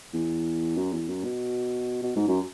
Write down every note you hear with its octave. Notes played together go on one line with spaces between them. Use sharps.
E2
F#2
E2
F#2
B2
B2
G#2
F#2